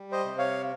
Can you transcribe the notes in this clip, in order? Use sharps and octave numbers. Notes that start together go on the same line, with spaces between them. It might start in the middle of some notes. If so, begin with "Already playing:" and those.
Already playing: G3
C5 D#5
C3
C#5 F5